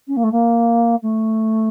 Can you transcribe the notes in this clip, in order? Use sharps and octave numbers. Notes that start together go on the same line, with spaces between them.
C#4
A#3
A3
A#3
A3